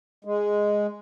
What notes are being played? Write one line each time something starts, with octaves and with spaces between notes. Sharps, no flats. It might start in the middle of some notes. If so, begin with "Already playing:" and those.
G#3